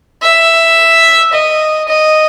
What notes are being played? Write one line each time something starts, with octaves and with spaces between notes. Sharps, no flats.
E5
D#5
D#5